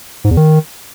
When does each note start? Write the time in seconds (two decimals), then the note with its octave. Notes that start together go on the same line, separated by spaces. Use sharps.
0.24 G#2
0.31 E2
0.37 D#3